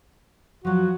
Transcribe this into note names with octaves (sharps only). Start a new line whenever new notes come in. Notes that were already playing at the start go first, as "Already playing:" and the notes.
F3 F#3 F#4